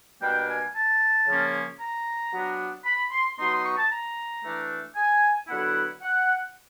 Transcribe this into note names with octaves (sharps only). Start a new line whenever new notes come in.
B2 G3 A#3 D4 G5
G#5
A5
C#3 F3 A#3 C#4
A#5
F#3 B3 D4
B5
C6
F#3 B3 D#4 C6
C6
C#6
A5
A#5
E3 A3 D4
G#5
D3 F#3 B3 E4 F#5
F#5